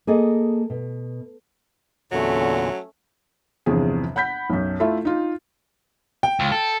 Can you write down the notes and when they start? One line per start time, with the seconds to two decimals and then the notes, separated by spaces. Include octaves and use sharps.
0.07 A#3 G#4 A4 D#5
0.70 B2
2.12 E2 A#2 D3 F#3 A3 C#4
3.66 G1 E2 C3 F3 G#4
4.16 F#5 B5 G6 B6
4.50 B1 F#2
4.80 A3 E4 F4 E5
5.05 D#4 F4
6.23 G5
6.40 C#2
6.52 A4